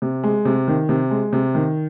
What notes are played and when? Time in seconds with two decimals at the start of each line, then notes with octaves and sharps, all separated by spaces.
0.02 C3
0.23 G#3
0.45 C3
0.68 D#3
0.89 C3
1.11 G#3
1.33 C3
1.55 D#3